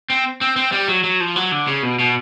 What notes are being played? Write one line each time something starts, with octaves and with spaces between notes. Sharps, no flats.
C4
C4
C4
G3
F#3
F#3
F3
F#3
D3
C#3
B2
B2